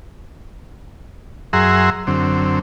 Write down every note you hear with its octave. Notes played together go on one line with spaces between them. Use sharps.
F#2 G#4 E5 F#5 A#5 C6
F#2 D3 C4